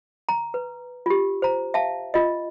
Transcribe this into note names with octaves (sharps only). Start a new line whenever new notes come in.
A#5
B4
F4 G4
C5 A#5
E5 F5 A5
F4 D#5